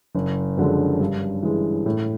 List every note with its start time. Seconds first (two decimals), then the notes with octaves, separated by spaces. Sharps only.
0.15 F#1
0.57 F#2 D3 F3 G#3
1.00 G2
1.43 E3 G#3
1.86 A2